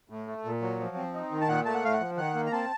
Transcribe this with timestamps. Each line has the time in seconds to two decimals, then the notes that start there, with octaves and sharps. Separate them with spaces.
0.10 A2
0.27 A3
0.45 A#2
0.62 F#3
0.80 F3
0.96 C4
1.14 D#4
1.31 D#3
1.41 A5
1.48 A#2 F#5
1.66 A3 A5
1.75 F#5
1.83 A2 F5
1.94 F#5
2.01 F3
2.17 D#3 F#5
2.35 A#3
2.46 A#5
2.52 C4 A5